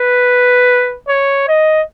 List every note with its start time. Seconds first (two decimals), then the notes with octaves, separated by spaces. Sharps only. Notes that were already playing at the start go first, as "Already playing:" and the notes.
Already playing: B4
1.09 C#5
1.48 D#5